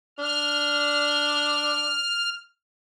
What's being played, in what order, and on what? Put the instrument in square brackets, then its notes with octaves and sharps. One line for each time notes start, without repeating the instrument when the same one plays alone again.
[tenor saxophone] D4 [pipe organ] F6